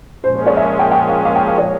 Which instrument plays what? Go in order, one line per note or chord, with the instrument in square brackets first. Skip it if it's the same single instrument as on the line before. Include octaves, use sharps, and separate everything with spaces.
[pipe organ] A#2 F3 G#3 C#4 [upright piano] C5
[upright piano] C5
C#5
E5
G5
G5
F5
F5
G5
F5
C#5